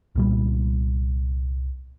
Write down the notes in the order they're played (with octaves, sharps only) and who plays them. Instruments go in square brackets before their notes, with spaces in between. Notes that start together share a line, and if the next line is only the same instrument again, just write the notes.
[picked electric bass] C2 A#2 G3